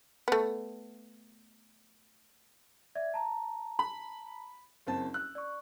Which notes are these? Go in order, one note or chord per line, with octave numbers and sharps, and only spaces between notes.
A3 B3
D5 E5 G#6
A5 A#5
B5
F#1 C4 A5
E6 F#6
D5 C#6